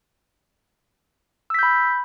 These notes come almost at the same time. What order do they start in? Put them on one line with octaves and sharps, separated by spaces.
E6 B6 G6 B5